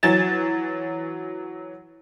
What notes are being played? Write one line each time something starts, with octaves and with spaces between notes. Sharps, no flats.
E3 F#3 G#6 A6 E7